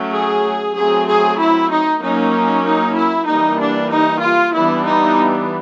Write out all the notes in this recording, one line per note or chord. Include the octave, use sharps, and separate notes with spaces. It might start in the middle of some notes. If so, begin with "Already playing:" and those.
Already playing: F#3 A3 C#4
G#4
F#3 A3 C4 G#4
G#4
E4
D#4
F#3 A#3 C#4 D#4
D#4
E4
E3 G3 A#3 D#4
D4
D#4
F4
E3 G3 B3 D4 E4
D#4